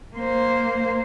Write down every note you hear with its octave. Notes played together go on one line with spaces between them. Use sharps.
A#3 C5